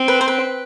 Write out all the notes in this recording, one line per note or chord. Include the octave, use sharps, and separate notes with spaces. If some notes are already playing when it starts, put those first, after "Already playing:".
Already playing: C4
B4
C5
B4